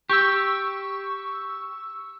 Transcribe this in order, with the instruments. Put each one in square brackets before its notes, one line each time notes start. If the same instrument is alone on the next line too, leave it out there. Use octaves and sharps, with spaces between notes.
[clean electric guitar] G4 [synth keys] C#6 E6